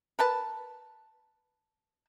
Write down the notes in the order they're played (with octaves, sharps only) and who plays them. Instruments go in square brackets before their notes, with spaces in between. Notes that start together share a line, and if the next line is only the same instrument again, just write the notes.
[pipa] A#4 B4 A5